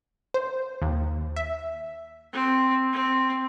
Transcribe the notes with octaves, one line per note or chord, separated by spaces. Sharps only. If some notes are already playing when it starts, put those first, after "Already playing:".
C5
D#2
E5
C4
C4